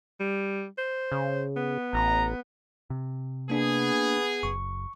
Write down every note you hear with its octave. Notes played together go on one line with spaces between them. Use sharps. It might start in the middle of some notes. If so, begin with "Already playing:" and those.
G3
C5
C#3
B3
A1 A#5
C3
A#3 B3 D4 G#4
F#1 C#6